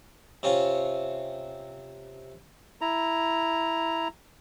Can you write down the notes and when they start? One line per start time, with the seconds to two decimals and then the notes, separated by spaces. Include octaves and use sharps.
0.43 C3 C#4 F4
2.81 E4 A#5